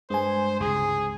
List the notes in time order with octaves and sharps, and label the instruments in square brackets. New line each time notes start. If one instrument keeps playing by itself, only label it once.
[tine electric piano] G2 [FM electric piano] G#3 G#5 [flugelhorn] C5
[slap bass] C#2 C3 [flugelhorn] G#4